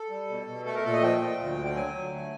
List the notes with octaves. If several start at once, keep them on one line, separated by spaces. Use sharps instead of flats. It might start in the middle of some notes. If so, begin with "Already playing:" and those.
Already playing: A4
G3
B2
B2
A3 A4
A#4
A#2 A4
D#5
F3 G5
F3
D2
D3
G5
F#3 G#5
D3
A3